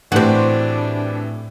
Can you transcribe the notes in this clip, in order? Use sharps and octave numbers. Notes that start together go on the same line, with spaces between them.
A2 E3 C4 D4 F#4 G4